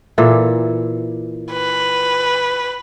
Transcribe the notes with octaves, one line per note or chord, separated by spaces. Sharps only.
A#2 E3 A4
B4